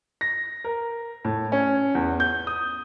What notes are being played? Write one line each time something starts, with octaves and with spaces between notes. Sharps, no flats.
A#6
A#4
A2
C#4
E2
G6
D#6